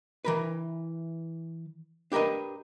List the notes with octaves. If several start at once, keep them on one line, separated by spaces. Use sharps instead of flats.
E3 A#4 B4
D4 G4 A#4 B4 D#5